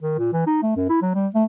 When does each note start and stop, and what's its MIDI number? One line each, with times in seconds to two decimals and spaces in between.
0.01 0.16 51
0.18 0.28 46
0.32 0.46 52
0.46 0.62 63
0.62 0.73 57
0.76 0.88 42
0.89 0.98 64
1.02 1.12 54
1.14 1.27 55
1.34 1.44 57